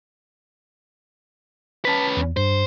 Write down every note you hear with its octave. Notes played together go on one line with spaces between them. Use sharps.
C#4 B4 A5 B6
E2
G2 C5